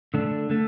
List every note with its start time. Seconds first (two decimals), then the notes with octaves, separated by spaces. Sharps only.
0.14 D3 A3 D4
0.50 D3 A3